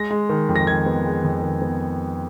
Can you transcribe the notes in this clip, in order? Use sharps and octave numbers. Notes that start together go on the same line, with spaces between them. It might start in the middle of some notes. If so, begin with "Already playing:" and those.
Already playing: G#3 A#6
G#3
D#3
F2
A#6
D#3 G#6
B3
G#3
F2
D#3
B3